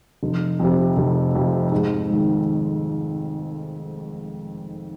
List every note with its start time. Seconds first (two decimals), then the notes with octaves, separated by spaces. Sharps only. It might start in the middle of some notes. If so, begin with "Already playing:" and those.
0.23 F1
0.60 F2 C3
0.97 F1
1.35 F2 C3
1.72 G#2
2.09 D#3 G#3